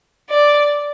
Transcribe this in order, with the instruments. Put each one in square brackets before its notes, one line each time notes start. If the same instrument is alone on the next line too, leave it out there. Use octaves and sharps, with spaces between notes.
[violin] D5